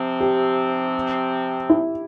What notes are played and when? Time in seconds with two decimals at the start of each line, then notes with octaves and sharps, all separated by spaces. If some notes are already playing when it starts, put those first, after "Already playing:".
Already playing: C3 F3 C4
0.20 G4
1.70 E4